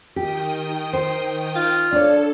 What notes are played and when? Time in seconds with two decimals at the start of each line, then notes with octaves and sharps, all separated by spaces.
0.16 D#3 G4 G5 D#6
0.93 C5
1.55 F4
1.92 D4 A4 C#5 D5